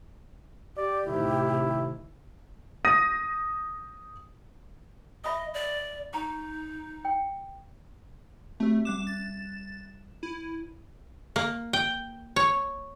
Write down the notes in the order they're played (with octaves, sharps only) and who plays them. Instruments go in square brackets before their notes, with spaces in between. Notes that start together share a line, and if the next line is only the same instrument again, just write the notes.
[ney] G4 [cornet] D5
[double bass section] A2 C3 D#3 [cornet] E4
[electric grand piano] D#6 [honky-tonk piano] A#6 D#7
[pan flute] D#5 [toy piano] E5 B5 D#6
[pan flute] D5
[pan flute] D#4 [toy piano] A#5 C#6
[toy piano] G5
[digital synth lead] A3 [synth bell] C4 G4
[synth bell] G3 F#6 E7 [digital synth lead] D6
[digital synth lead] A6
[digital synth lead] E4 [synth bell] D#7
[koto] A#3
G5
C#5